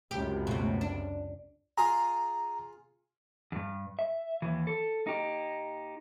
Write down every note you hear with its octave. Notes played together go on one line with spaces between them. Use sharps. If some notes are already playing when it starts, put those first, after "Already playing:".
C#2 F#2 C3 G4
B2 A3
D4
F4 G#4 G#5 A#5
E2 G2
E5
D#2 E3
A4
D#4 G4